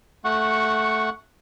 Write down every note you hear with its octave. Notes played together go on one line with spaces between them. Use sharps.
A3 F#5 C#6